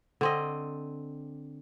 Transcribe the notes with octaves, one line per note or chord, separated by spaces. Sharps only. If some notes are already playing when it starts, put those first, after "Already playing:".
D3 C4 D#5